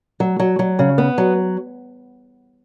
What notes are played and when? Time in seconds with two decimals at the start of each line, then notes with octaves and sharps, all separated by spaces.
0.20 F#3
0.40 F#3
0.59 F#3
0.79 C#3
0.98 B3
1.18 F#3